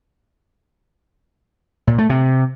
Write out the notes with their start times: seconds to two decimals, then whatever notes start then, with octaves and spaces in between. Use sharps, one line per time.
1.87 A#2
1.98 A3
2.10 C3